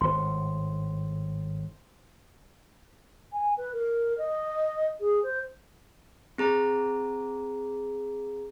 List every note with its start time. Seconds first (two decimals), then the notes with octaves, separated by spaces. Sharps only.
0.01 G#1 A2 C5 C6
3.33 G#5
3.57 B4
3.73 A#4
4.18 D#5
5.00 G#4
5.23 C5
6.38 C4 G#4 A#5